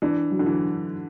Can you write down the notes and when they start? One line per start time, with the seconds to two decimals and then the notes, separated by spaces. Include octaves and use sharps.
0.02 E3 D4
0.31 F#3
0.39 D3
0.46 E3